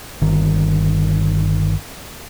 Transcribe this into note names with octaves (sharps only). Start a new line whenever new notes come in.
G1 D#3